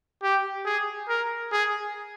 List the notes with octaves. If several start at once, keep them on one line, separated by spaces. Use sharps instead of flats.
G4
G#4
A#4
G#4